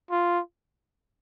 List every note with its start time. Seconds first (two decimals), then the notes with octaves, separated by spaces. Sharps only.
0.11 F4